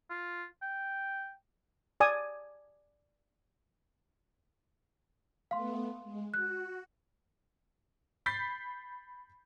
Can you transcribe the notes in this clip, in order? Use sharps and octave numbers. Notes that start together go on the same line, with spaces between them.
F4
G5
D5 G#5 D#6
A3 B3 F5 C6
G#3
F#4 F#6
B5 G6 A6 B6 C7